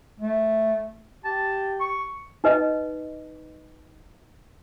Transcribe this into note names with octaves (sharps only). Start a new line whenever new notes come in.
A3
G4 A5
C#6
D#4 B4 D#5